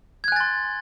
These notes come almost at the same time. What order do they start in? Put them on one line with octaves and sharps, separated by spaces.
G#6 F#6 G#5 A6 C6